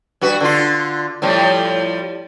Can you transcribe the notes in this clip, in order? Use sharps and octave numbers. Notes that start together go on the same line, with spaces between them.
G2 F#4 B4
D3 F4
A2 F3 G3